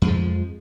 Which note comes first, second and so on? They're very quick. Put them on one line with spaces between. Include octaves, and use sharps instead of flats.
F2 G#3 F3